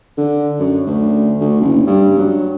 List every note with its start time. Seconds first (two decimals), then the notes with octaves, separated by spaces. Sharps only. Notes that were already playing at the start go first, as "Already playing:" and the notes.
0.18 D3
0.60 F#2
0.87 D2
1.40 D2
1.61 F#1
1.87 G2
2.19 F#3